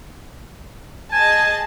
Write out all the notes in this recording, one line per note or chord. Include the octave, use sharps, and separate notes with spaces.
G#4 D#5 G#5 A5